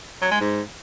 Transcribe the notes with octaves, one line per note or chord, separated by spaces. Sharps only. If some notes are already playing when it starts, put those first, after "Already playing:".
F#3
G#3
G#2